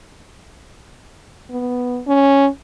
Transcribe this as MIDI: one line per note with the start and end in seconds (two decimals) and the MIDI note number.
1.50 2.00 59
2.07 2.48 61